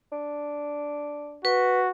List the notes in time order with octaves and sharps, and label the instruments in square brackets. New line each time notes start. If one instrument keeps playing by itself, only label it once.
[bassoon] D4
[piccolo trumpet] F#4 [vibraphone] B4